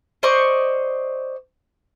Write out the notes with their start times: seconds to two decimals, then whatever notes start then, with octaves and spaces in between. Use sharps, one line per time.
0.23 C5 D5 D#5 C#6